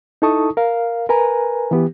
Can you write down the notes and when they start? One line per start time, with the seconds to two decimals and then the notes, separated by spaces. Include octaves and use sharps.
0.22 D#4 E4 A4 A5 C#6 D#6
0.57 A#4 F5
1.09 A#4 B4 G#5 A#5
1.71 E3 B3 G4